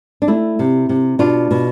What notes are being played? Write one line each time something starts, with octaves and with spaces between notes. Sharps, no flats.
D4
A3 E4
C3
C3
B2 D4 F4
B2